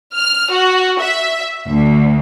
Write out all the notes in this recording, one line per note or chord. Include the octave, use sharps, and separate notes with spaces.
F6
F#4
E5
D2